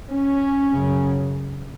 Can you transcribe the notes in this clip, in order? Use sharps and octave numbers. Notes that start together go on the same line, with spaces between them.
C#4
F#2 C#3